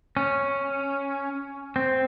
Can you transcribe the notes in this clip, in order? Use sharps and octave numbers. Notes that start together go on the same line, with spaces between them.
C#4
C4